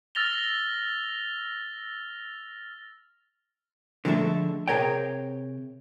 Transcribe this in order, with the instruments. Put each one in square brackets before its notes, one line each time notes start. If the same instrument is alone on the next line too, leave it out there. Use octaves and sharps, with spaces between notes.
[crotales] E6 F6 A6 A#6 F7 G7
[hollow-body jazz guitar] D3 F3 G#3 A3 A4 E5
C3 G#4 A#4 C#5 G5